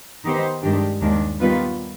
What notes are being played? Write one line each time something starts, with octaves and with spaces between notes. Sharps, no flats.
D#3 B3 D#4 G4 C5
G2 D#3 G#3 D4 G4
D#2 D#3 G#3 D4
D#3 G3 B3 F4 B4